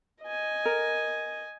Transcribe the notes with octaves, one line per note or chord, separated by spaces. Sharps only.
D#5 G#5
A#4